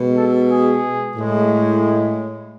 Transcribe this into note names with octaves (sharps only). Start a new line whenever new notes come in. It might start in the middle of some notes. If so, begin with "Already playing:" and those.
Already playing: B2 G#3
A4
G#4
A2 G#3